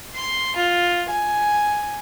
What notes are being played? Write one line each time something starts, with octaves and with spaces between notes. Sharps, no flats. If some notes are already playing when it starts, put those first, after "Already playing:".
C6
F4
G#5